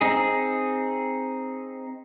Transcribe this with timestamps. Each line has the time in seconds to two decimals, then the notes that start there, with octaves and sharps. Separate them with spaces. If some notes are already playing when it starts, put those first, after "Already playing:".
0.01 C4 D#4 G#4